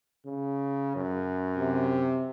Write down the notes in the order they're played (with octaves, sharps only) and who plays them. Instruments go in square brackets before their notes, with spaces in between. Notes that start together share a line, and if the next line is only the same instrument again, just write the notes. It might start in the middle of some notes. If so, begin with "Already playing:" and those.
[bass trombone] C#3
F#2
[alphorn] C3